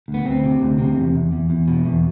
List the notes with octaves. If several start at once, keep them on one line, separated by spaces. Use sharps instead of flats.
D2
B3
D2 C4
C3
D2
C3
E2
E2
E2
E2
B2
E2